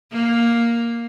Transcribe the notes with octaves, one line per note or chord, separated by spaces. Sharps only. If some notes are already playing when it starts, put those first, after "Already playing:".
A#3